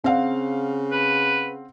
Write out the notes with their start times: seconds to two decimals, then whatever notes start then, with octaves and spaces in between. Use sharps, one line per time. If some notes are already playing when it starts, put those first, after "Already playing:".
0.04 C#3 C4 F5 F#5
0.91 B4